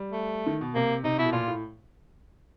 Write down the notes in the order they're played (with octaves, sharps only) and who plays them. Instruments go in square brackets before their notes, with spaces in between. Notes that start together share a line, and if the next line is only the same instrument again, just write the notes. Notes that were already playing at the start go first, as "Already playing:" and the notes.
Already playing: [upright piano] G3
[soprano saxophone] A3
[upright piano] D#3
B2
[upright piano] C3 [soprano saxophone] A#3
[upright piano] C3 [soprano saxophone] D#4
[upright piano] B2 [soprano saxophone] E4
[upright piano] A2
[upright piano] A#2 [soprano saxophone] F4
[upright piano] A2